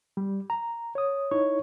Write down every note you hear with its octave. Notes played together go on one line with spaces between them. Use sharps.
G3
A#5
C#5 D#6
D#4 E4 C#5 C#6